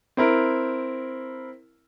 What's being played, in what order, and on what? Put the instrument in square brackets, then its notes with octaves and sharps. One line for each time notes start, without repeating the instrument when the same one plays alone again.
[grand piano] C4 E4 A#4